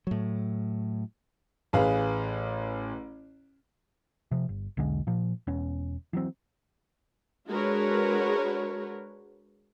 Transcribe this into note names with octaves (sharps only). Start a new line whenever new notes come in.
A2 F#3
A1 G#4 B4 F5
C3 F3
G1
B1 E2 D3 G#3
A#2 F3
E1 B3 C#4
E3 F#3 C4
G#3 D4 F#4 A#4 B4 C#5